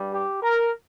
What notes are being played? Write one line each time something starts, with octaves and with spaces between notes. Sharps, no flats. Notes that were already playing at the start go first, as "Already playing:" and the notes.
Already playing: G2 G3
G4
A#4